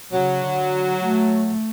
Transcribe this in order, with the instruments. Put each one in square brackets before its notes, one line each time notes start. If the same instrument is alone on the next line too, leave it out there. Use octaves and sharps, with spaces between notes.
[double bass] C#3 [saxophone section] F#3
[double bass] D3
A3